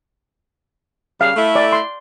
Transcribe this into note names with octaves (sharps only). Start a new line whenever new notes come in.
C#3 G3 F5
A3 E4
D5
C6